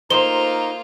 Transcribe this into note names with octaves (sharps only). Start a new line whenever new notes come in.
A#3 D#4 F4 C5 G7